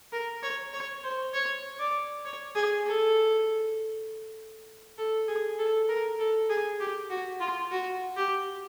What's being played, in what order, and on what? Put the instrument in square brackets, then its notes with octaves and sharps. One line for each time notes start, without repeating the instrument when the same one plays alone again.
[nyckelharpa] A#4
C#5
C#5
C5
C#5
D5
C#5
G#4
A4
A4
G#4
A4
A#4
A4
G#4
G4
F#4
F4
F#4
G4